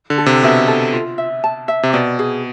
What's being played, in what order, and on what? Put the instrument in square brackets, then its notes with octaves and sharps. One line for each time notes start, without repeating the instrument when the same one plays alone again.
[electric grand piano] D3
[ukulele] A4
[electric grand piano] C3
[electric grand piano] B2 [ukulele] E5
[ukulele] A4
F4
E5
A5
E5
[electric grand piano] C3
[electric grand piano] B2 [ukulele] D5
[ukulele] G#4